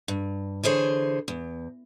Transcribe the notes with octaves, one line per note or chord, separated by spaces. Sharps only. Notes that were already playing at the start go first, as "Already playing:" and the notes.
G2
D3 E3 G#4 C5 C#5
E2